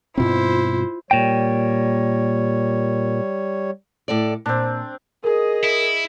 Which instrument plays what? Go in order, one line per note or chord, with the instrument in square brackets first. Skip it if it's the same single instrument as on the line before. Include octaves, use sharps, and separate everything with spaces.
[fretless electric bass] G2 B2 C4 [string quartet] E4 C5 [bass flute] F4
[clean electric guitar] A#2 G5 [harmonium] G3 C#5
[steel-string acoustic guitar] A2 A4 D5
[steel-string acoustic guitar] A#2 [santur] C4 D4
[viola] G#4 D#5 [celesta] A#4
[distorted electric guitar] E4